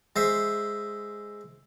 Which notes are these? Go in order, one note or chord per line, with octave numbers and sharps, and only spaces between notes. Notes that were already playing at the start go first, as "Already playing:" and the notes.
G#3 C5 E5